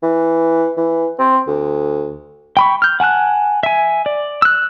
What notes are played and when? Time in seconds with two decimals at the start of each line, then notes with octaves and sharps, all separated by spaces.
0.03 E3
0.77 E3
1.19 C4
1.47 D2
2.57 G5 B5 C#6
2.82 F6 G6
3.00 F#5 G#5 A5 F#6
3.63 E5 G#5
4.06 D5
4.42 E6 F#6